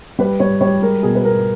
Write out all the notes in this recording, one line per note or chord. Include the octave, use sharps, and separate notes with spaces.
G3 B4
G3 C#5
G3 C#5
G#3 A#4
B2 G#4
B4
B2 A#4